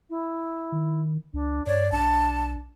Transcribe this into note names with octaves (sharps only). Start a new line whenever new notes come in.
E4
D#3
C#2 D4
G2 C#5 D5
B1 D4 A5